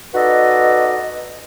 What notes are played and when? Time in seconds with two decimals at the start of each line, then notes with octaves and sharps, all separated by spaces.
0.15 D#4 F#4 A4 B4 D5 D#5